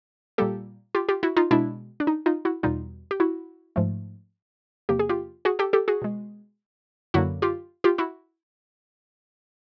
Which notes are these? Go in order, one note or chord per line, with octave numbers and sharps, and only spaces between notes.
A#2 G3 A#3 G4 A4
F4 G4
F4 G4
E4 F#4
D#4 F4
B2 G#3 D4 E4
D4
D#4
D#4 F4
E4 F#4
E2 B2 G3 D#4 F4
G4
E4 F#4
G#2 F3 A3
E2 C3 F3 A#3 G4
G#4
F4 G4
F#4 G#4
G4 A4
G4 A4
F#4 G#4
B2 G#3
F#2 D3 F#3 A#3 E4 F#4
F4 G4
F4 G4
E4 F#4